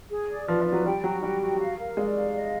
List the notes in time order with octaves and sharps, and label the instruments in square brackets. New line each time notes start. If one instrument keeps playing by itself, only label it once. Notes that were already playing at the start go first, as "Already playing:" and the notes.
[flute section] G#4
D5
[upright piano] F3 [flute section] B4
[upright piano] F3
[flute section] D5
[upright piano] F#3
[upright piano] G3 [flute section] G5
[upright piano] F#3 [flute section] F#4
[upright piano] G3 [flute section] G5
[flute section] F#4
F5
A#4
[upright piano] G#3 [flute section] D5
[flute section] F5
D#5